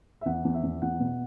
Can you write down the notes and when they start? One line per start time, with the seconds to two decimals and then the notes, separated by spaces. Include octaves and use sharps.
0.21 E5
0.26 E2 F#5
0.45 E2
0.54 E5
0.63 E2
0.82 E2 F#5
1.00 B2